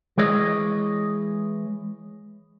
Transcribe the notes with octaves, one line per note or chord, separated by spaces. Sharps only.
E3 G#3 C#5 D#5